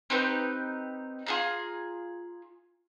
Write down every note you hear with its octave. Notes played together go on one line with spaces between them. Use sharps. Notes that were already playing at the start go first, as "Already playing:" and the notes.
C4 D#4 G4 B4
F4 G#4 A#5